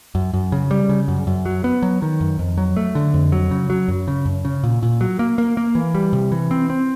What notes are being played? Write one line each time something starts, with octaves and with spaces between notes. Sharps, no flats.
F#2
F#2
C#3
G3
C#3
F#2
F#2
F#3
B3
F#3
D#3
F#2
F2
F#3
A3
D3
F2
F#3
C#3
F#3
F#2
C#3
F#2
C#3
A#2
A#2
F#3
A#3
A#3
A#3
E3
G3
C3
E3
C4
C4